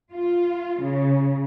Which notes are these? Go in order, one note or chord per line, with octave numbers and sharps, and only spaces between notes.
F4
C#3